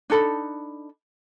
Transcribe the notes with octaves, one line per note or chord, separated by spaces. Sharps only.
D4 D#4 A4 B5